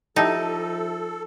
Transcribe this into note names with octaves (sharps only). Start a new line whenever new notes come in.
F3 D#4 E4 G4 A4 A5